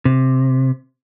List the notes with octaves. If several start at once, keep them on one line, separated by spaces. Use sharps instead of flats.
C3